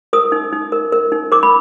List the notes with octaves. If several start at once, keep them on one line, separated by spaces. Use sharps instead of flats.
A#4 D#6
D#4
D#4
A#4
A#4
D#4
A#4 D6
B5